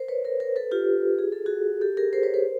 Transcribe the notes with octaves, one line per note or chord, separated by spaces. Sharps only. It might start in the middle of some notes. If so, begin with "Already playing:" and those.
Already playing: A#4 C5
B4 C#5
A#4 C5
A#4 C5
A4 B4
F4 G4
G#4
A4
F#4 G#4
G4 A4
G#4 A#4
A#4 C5
B4 C#5
A#4 C5